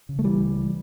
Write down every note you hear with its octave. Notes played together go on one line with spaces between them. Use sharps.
C#3
A3
E3 G3
C#2